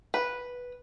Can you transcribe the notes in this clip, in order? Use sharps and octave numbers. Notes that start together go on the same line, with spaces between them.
B4